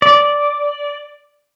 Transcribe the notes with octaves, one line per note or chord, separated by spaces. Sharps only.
D5